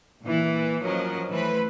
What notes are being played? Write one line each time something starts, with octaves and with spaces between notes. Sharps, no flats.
A#2 E3
F3 F#3 C#4 A#4 D#5
E3 A3 B4 C5